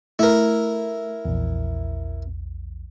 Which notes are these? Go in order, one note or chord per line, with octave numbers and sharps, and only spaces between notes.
A3 E4 A#4
A#1 E2